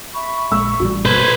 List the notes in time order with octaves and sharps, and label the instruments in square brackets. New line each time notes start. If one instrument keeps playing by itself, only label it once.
[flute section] E5 B5 C#6
[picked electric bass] A#1 G#3 [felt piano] E6
[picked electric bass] A1 A2 G3 [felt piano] F#4
[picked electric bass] G1 B2 A#3 [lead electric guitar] B4 C5 [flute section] G#6